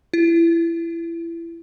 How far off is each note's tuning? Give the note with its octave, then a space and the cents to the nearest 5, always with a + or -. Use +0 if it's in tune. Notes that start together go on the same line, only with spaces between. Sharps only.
E4 +25